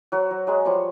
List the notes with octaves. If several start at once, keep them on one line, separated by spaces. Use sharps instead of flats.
F#3 F#4 C5 C#5
F#3
F#3 G#3 G#4
F3 G3 C#5 C#6